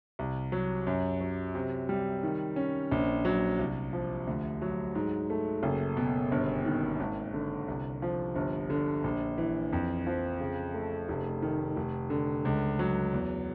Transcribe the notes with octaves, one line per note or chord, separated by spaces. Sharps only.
C2
F#3
F#2
F#3
C3
G3
D#3
C#4
A#1
F#3
C2
F3
D2
F#3
G#2
A3
F#1
B2
G1
D#3
G#1
D3
C2
F3
G1
D3
A#1
E3
F2
F3
C#3
A3
F1
D#3
F1
D3
C#2
F#3
E2